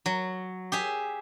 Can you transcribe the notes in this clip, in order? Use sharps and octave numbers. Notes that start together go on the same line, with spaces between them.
F#3
G4 G#4 E5